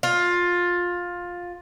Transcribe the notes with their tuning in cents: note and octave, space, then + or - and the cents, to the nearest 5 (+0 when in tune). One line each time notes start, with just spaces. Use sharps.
F4 +15